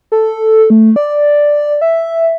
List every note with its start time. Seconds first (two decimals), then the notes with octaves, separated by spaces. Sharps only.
0.12 A4
0.70 A3
0.96 D5
1.81 E5